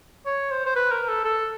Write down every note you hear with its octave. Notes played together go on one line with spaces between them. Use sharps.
C#5
C5
C5
B4
A#4
A4
A4